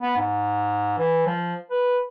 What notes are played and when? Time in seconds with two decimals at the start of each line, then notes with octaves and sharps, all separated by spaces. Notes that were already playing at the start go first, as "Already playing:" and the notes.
0.01 B3
0.17 G#2
0.97 E3
1.26 F3
1.70 B4